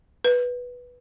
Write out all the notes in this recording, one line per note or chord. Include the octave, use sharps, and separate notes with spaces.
B4